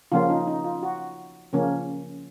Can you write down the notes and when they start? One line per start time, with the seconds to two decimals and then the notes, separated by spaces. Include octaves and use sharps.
0.12 C#3 F3 A#3 C#4 F4
0.30 D#4
0.47 D#4
0.64 F4
0.83 F#4
1.53 C#3 F3 A#3 C#4